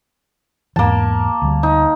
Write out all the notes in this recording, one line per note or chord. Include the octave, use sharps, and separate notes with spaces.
E2 G#2 E3 A#3 A5
D2 G3
D#4